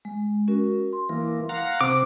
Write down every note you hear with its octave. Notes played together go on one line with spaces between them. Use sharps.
G#3
C#4 F#4 A#4
C6
E3 A#3
F5 F#5 A#5
C3 C4 D6